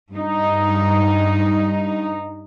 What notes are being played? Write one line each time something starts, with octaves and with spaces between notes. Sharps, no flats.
G2 D#4